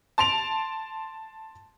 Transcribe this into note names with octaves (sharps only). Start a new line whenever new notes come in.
A5 C6 D7 F7